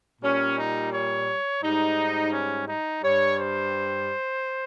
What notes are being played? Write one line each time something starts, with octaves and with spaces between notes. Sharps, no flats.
A#2 G3 C#4
D#4
C#5
G#2 G3 D#4
C#4
D#4
G2 G3 C#5
C5